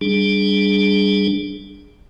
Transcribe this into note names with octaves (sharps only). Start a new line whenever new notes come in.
G3 D4 G#4